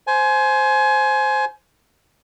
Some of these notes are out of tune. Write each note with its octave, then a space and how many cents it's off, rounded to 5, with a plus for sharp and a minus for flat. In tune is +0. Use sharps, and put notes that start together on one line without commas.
C5 +0 G#5 +20